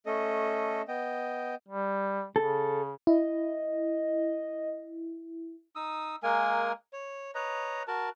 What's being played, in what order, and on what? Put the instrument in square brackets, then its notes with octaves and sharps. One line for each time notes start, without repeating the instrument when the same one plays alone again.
[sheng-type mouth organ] A3 C#4 A4 D#5
B3 D#5 G5
[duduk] G3
[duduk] C#3 [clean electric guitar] A4
[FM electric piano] E4 [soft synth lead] D#5
[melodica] D#4 D#6 E6
G#3 A#3 A#4 G#5
C#5
B4 C#5 D#5 A#5
F#4 A#4 A5